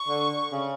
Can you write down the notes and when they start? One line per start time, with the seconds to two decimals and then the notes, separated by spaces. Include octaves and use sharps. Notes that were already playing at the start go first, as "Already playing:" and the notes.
Already playing: C#6
0.08 D3
0.52 C#3